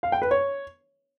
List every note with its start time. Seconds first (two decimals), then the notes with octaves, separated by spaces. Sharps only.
0.03 F5
0.12 G5
0.22 B4
0.31 C#5